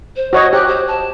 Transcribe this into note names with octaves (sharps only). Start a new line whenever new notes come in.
C5
F#4 C5 C#5 D#5
G4 F#6
C5
A5